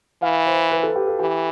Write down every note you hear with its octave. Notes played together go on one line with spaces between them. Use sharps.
E3 F5
C5
B4
A4
G4
A4
E3 G4